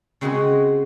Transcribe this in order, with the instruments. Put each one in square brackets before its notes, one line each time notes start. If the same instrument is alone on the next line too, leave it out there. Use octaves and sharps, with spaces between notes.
[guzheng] C#3 G#3 C4 F#4 D#5 C6